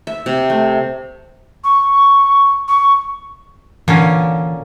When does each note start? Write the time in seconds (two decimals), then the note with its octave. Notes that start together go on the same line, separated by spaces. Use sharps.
0.07 E5
0.26 C3
0.50 A3
1.64 C#6
2.68 C#6
3.88 A#2 D3 E3 C#4